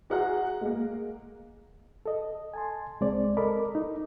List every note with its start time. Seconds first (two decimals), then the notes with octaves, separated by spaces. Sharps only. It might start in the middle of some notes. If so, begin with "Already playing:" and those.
0.10 F#4 G#4 F#5 A#5 F#6
0.61 G#3 A#3
2.06 A4 D#5
2.54 G#5 A5 C6
3.01 C2 G#3 C4 C5 D5
3.37 A4 A#4 D#5 B5 D6
3.75 D#4